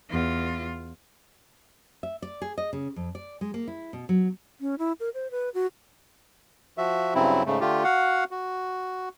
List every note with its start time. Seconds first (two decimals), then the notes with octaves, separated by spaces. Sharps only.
0.10 E2 F4
2.03 E5
2.22 D5
2.42 G#4
2.58 D#5
2.73 C#3
2.96 F2
3.15 D5
3.41 G#3
3.54 A#3
3.68 E4
3.93 B2
4.09 F#3
4.61 C#4
4.79 E4
5.00 A#4
5.14 C5
5.31 B4
5.54 F#4
6.78 F3 F#4 E5
7.15 G2 C#3 F#3 C4 E4
7.46 G#2 C#3 A3
7.60 D3 A3 F4 G4
7.84 F#4 F5 F#5
8.31 F#4